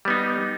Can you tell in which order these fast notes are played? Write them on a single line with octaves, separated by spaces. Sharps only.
G3 B3 D#4